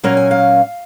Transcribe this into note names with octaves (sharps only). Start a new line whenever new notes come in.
A#2 F#3 A#3 C#4 A#5
G#5
F5